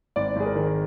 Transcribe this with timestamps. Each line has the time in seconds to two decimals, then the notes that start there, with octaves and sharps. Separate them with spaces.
0.16 G#1 D5
0.36 G#1 G#4
0.45 A#4
0.55 D#3